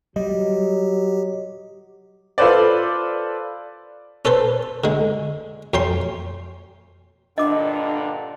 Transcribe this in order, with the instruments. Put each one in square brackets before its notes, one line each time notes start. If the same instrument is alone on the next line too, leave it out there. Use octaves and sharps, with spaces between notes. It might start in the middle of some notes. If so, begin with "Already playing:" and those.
[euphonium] F#3 [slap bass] G3 [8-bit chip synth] G4 [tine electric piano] D#5
[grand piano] F4 A4 B4 C5 D5
[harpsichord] C#4 A4 B4 C5
D3 G#3
F2 C#4 G5 C6
[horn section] G2 A#2 D3 [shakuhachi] D4 [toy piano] D#5 D6